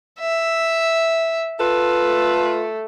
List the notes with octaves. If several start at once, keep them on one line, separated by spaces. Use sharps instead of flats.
E5
F4 A4 B4
A3